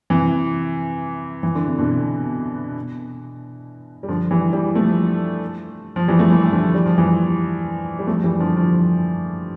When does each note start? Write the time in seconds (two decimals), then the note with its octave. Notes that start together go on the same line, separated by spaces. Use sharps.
0.10 C3 E3
1.43 E3
1.55 D3
1.67 C3
1.78 B2 D3
4.03 G3
4.08 D3 F3
4.31 E3 G3
4.53 E3 G3
4.75 F3 A3
5.96 F3
6.08 E3 G3
6.19 A3
6.29 E3 G3
6.43 E3
6.52 D3 F3
6.74 G3
6.86 F3
6.98 E3 G3
7.99 G3
8.07 F3 A3
8.24 E3 G3
8.40 D3 F3
8.56 D3 F3